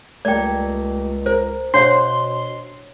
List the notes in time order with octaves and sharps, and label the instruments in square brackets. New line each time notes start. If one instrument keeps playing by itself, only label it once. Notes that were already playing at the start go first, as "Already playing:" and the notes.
[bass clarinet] C#2 [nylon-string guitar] G3 A3 A#3 [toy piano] D5 G5
[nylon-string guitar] A#4 [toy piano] C5
[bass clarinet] B2 [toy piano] D4 C#5 [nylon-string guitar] C5 F5 F#5 [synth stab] C6